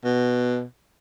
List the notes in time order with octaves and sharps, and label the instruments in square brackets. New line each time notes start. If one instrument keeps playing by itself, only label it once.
[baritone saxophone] B2